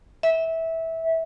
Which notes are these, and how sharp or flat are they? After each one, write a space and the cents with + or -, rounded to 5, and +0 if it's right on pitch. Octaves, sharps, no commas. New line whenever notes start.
E5 -15